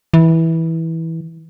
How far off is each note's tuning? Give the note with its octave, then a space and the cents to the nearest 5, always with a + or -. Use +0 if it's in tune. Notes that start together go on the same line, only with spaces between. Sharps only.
E3 -15